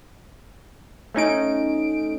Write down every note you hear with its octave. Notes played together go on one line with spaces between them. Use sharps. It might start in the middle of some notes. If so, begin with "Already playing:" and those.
A3 C#4 D#4 D7